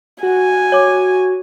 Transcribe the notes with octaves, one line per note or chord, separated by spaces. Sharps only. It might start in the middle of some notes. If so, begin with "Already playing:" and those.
F#4 G#5
C#5 D6